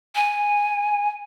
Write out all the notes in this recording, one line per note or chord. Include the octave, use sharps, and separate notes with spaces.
G#5